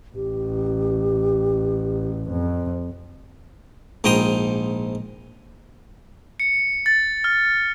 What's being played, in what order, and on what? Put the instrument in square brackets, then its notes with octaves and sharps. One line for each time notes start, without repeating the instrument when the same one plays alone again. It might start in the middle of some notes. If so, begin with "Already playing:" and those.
[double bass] A1 [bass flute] G4
[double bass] F2
[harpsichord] A#1 G#2 G5 A#5 C6 D#6
[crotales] C#7
A6
F6